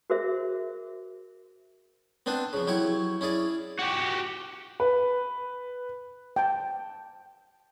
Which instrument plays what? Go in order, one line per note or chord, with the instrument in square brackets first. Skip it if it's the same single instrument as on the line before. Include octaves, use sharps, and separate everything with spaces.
[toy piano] F#4 G#4 A#4 C5 E5
[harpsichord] B3 C4 D4 B4 C5
C#3 F3
F#3 E4 G4 C#5
C#4 E4 G#4 D5
[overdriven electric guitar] F#4 G4
[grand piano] B4
[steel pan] G5 A5